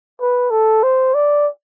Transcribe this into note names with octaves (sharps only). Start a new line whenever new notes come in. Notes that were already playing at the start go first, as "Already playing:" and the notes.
B4
A4
C5
D5